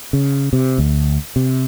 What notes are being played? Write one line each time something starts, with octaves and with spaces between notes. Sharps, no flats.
C#3
C3
D2
C3